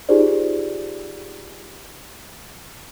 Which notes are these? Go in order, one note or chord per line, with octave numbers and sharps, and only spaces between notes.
D#4 F4 G4 G#4 C5 D5